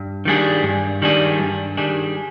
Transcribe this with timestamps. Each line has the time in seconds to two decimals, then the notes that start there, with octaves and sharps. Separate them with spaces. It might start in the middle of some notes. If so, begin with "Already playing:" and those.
Already playing: G2
0.25 D#3 G3 D4 G#4
0.63 G2
1.02 D#3 G3 D4 G#4
1.39 G2
1.77 D#3 G3 D4 G#4